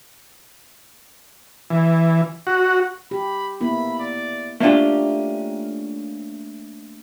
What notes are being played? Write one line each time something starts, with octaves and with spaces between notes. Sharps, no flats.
E3
F#4
G4 B5
A#3 B3 E4 B5
D5
A3 A#3 C#4 D4 F4 G4